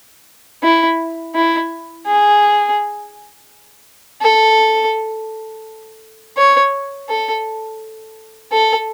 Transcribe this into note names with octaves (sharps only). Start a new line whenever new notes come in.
E4
E4
G#4
A4
C#5
A4
A4